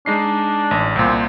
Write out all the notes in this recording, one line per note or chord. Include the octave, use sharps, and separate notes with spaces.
G#3 D4 D#4 C7
A1
C2 A#2 C4